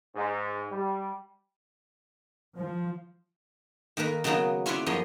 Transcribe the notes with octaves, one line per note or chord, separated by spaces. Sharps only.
G#2
G3
F3
D#3 A#3 A#4 B4
C#3 F#3 A#3 B3 D#4 F#4
C#4 E4 F4 B4 C#5 D5
F#2 F3 B3 G#4 D#5